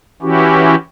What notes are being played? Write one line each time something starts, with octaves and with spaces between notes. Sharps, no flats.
E3 C#4 E4 F#4 G4